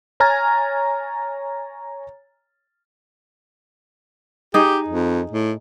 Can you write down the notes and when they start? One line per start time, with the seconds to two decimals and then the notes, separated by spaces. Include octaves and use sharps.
0.20 C#5 G#5 A#5 F6 G#6 A6
4.54 D#4 G4 G#4
4.88 F2
5.32 A2